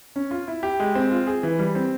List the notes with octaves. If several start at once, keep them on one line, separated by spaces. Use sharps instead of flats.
C#4
F4
E4
G4
G#3
C4
F4
G#4
E3
G3
C4